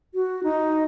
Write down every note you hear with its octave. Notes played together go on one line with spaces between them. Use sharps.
F#4
D#4